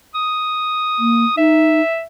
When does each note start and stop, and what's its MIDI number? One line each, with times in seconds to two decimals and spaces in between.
0.15 1.36 87
0.99 1.25 58
1.37 1.81 63
1.37 2.04 76